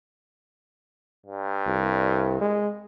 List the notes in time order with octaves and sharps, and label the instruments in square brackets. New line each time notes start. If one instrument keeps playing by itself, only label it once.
[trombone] G2
[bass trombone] C2
G#3